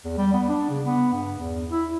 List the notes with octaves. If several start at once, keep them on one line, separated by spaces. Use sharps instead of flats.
E2
G3
B3
D4
C#3
B3
G2
E2
E4